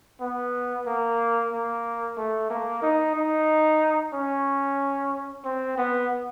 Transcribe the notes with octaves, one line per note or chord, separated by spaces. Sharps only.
B3
A#3
A#3
A3
A#3
D#4
D#4
C#4
C4
B3